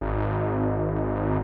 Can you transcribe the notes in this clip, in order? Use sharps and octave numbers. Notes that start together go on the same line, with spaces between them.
G#1